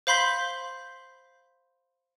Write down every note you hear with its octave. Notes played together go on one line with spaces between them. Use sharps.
C5 F5 B5 C6 G6 B6